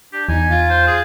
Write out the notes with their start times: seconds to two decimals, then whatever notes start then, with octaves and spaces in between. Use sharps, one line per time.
0.13 D4 G4
0.29 E2 D#4 G#5
0.50 F4
0.70 C5
0.87 G#4